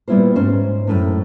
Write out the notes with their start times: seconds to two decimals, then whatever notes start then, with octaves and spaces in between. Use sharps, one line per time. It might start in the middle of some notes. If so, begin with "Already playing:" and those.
0.08 A#2 G3 B3 E4 F4 C5
0.36 G#2 C#4 C5
0.87 F#2 A2 C3